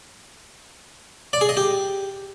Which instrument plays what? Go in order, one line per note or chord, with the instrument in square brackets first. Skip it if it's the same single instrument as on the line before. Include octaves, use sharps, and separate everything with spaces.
[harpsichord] D5
G#4
D#5
G4